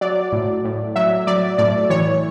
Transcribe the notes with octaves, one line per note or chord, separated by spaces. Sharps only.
F#3 D5
A2
A2
F#3 E5
F#3 D5
A2 D5
E3 C#5